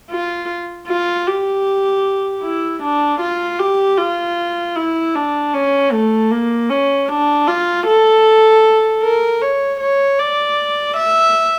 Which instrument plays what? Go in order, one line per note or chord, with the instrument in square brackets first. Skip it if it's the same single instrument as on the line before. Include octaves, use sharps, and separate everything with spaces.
[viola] F4
F4
G4
E4
D4
F4
G4
F4
E4
D4
C#4
A3
A#3
C#4
D4
F4
A4
A#4
C#5
C#5
D5
E5